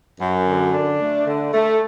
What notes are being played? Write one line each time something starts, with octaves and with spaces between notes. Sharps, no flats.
F#2
D3
D4
A3
D3
A3